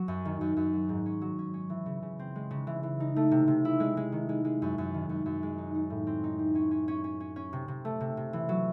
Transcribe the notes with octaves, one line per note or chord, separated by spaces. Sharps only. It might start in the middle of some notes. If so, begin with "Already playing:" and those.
Already playing: F#3
F#2
D#3
F#2
F#2
F#3
G#2
C#4
F#3
C#4
C#4
E3
C#3
C#3
C4
G#3
C#3
E3
E3
D#4
A3
C3
C3
E4
G#3
G#3
D#3
G#3
G#3
F#2
F#2
D#3
F#2
F#2
G#3
D#4
D#4
A2
C4
D#4
C4
C#4
C#4
C#4
C#4
C#4
C#4
C3
C3
A3
C3
C3
E3
F#3